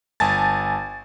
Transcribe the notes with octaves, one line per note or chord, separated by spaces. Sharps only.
G1 G#5 A5 A6